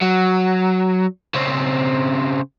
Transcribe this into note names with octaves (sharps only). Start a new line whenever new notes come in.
F#3
C#3 C4